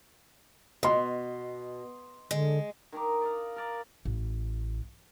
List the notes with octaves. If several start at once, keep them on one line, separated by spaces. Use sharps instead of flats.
B2 D#5 C6
D3 G#3
D#3 D#4 A#5 D6
D5 D#5 F5
A#4 D5
A1